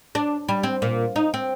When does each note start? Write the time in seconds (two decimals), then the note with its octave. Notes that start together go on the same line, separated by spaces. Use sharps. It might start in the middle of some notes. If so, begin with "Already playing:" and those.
0.15 D4
0.49 G3
0.63 C4
0.82 A#2
1.16 D#4
1.34 C4